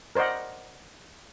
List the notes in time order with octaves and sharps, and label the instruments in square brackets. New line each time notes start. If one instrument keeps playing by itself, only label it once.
[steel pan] A#4 C5 D5 D#5 F#5